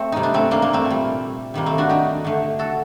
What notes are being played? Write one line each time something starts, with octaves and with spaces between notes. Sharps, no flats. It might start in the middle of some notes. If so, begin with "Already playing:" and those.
Already playing: A3 C4
C3 G3 D#4
D4
A3 C4
A#3 D4
A#3
A3 C4
A#2
G3
C3 D#3 G3 A#3
A3 C4
D4 F#4
D#4 G4
D3 A3
F#4 A4